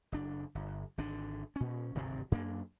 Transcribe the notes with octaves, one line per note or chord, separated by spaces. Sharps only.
F#1 D4
G1
G#1 D3 D4
A#2 C#4
D1 G#1 G2 C3
F#2 A#3 D4